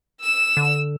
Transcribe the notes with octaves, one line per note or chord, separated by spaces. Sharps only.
E6 E7
D3